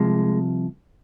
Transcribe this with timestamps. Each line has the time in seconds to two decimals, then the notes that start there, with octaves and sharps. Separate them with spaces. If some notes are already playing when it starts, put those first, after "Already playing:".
Already playing: C2 C3 F3 G#3